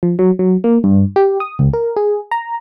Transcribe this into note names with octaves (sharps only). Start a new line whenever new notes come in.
F3
F#3
F#3
A#3
G2
G4
D#6
C#2
A#4
G#4
A#5